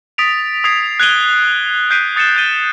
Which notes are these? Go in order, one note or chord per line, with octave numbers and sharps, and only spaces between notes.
D#6 A6 B6 D7 F7
D#6 G#6 C7 F7
F#6 G#6 C7 D7 D#7 G7
F#6 G6 B6 C7 D7 D#7
D#6 A6 C#7 D#7 E7 G7
G6 A6 D#7 G7